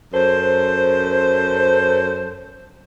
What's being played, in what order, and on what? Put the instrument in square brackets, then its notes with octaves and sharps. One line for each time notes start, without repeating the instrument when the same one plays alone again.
[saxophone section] F#2 A4 C5